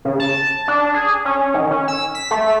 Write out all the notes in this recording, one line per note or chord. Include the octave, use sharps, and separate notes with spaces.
C#3
A5
D4
G#4
C#4
D#3
C#4
E6
B6
A3